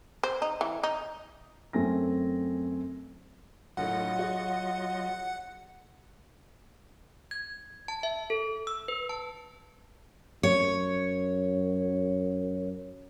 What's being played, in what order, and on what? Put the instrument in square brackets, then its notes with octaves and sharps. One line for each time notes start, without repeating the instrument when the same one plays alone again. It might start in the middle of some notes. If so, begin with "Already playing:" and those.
[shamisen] C5
D#4
E3
D#4
[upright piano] F#2 A3 C4 G#5 A#6
[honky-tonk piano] D2 A2 [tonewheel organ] F#3 F4 D#5 [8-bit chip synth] F#5
[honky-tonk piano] F#4 G#4
[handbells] G#6
A5
E5
A4
E6
B4
A5
[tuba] F#2 [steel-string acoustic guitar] C#5